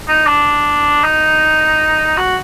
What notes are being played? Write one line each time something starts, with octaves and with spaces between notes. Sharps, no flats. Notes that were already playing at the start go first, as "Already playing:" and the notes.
D#4
D4
D#4
F#4